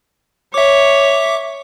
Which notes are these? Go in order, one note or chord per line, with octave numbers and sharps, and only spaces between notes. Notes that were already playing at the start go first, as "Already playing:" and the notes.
C#5 E5 D6